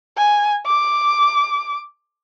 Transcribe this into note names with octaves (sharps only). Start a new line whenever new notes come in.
G#5
D6